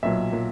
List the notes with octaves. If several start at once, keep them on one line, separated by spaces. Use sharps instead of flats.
B1 A#2 F#3 E5
A#2 F#3